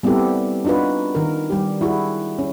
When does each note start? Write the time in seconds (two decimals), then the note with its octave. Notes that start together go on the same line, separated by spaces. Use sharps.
0.03 G3 B3 C4 E4 G4 A4
0.65 D4 D#4 F4 F#4 B4
1.15 D#3 A#4
1.50 G3 G4
1.81 E4 F#4 G#4
2.39 C#4